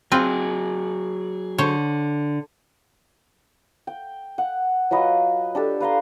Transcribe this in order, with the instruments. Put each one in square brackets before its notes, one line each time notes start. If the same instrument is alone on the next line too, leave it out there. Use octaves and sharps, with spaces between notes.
[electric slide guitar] F#3 G#4 [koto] C4 F4 B4
[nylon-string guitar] D3 [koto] C5 C#5
[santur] G5
F#5
F#3 F4 B4 D#5
D4 G4 A4
B4 F5 A#5 C6